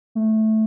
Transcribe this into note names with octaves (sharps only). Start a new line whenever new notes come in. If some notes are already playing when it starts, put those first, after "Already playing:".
A3